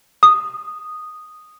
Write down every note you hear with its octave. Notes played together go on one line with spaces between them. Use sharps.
D#6